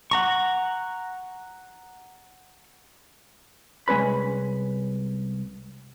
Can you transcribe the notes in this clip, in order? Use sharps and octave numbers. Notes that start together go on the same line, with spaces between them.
F#5 A#5 C#6
C2 G#3 C#4 B4 B5